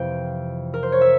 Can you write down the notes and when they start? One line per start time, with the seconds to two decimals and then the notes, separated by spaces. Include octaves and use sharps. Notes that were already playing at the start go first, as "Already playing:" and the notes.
Already playing: F2 C3 E3 F5 G5
0.74 A#4
0.83 C5
0.92 C#5
1.01 E5